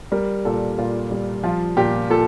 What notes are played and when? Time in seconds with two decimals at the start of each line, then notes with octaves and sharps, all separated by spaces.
0.12 G3 A#4
0.45 A#2 A4
0.78 A#2 F4
1.11 G3
1.44 F3 F4
1.77 A#2 G4
2.10 A#2 A4